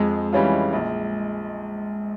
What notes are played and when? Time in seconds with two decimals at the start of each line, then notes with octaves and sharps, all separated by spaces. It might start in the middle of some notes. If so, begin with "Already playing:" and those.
Already playing: F2 G#3
0.33 E3 G3 C#4 F4
0.73 A#1